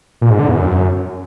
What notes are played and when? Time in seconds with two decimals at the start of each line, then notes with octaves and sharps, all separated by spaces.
0.21 A#2
0.30 G#2
0.39 D3
0.48 E2
0.57 F#2